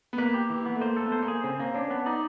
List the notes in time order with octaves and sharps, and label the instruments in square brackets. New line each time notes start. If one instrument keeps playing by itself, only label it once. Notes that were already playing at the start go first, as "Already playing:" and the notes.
[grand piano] B3
[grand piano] A#3 [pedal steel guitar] B4
[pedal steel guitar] G4
E3
B3
[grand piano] A3
[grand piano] A#3 [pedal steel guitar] C5
[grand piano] A3 [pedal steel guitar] A4
[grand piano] B3
[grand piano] A#3 [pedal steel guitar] C5
[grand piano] A#3
[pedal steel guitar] G#4
[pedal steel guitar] C#3 [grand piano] C4
[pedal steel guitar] A#3 [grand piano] C4
[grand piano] C#4 [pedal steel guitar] D4
[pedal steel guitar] B3
[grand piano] D#4 [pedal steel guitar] D5